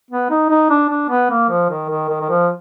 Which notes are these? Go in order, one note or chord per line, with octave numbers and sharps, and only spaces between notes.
B3
D#4
D#4
D4
D4
B3
A#3
F3
D#3
D#3
D#3
D#3
F3